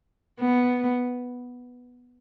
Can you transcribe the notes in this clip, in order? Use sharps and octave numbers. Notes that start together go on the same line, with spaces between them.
B3